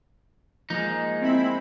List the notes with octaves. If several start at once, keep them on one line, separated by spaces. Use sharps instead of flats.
F3 G#3 A#3 D#4
C4 E4 B5